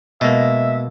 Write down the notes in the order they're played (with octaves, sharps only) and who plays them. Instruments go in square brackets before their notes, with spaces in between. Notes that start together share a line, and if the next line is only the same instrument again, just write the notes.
[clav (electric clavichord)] B2 A#3 [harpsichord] G#3 [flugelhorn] E5